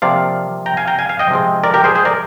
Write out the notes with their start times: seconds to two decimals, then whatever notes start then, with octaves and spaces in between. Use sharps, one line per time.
0.02 C3 F3 A#3 D5 F5
0.66 G5 A#5
0.77 F5 G#5
0.87 G5 A#5
0.99 F5 G#5
1.09 F5 G#5
1.19 D#5 G5
1.30 C3 F3 G#3 C4
1.64 A#4 D5
1.74 G4 A#4
1.84 G#4 C5
1.95 G#4 C5
2.05 A#4 D5